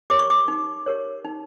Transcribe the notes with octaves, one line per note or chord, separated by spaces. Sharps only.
G4 A#4 C#5 D6
C#6
D6
D#4
G4 A#4 C#5
D#4